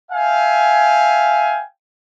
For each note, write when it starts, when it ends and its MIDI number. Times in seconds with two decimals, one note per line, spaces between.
0.11 1.62 76
0.11 1.62 77
0.11 1.62 79
0.11 1.62 80